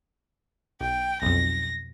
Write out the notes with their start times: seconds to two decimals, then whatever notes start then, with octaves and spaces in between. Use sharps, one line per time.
0.81 B1 G5
1.22 B1 F2 A#6